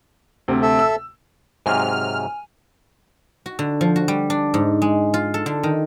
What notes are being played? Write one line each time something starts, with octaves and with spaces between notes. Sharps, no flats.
D2 C3
A4 E5
E6
G#2 C3 F#3 G#5 F6
F#4
D3
F3
F#4
G3
D4
G#2
G#3
F4
A4
D3
D#3